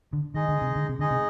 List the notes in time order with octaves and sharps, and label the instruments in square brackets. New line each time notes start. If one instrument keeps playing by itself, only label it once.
[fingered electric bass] D3
[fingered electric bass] D#3 [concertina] G#3 D#4 G#4 D#5
[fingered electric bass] D3
C3
D3
C3
[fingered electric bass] D3 [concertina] G#3 D#4 G#4 D#5
[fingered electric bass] C3